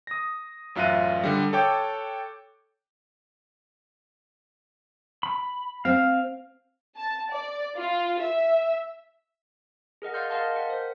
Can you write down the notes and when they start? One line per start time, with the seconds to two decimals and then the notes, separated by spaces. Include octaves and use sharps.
0.07 D#6 A#6
0.75 A1 F#2 F4 E5 F#6 D#7
1.24 D3 G3
1.53 A4 C#5 G5 D6 G6
5.23 B5
5.85 C4 F5
6.97 A5
7.33 D5
7.78 F4
8.21 E5
10.02 G#4 A#4 D#5 F#5
10.14 D5 F5 F#5 C6 F6 G6
10.30 A#4 D#5 F5 F#5 A5 C6
10.55 A#4 F#5 G5
10.70 A#4 C5